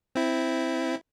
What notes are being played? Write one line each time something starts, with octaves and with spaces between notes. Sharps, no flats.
C4 E4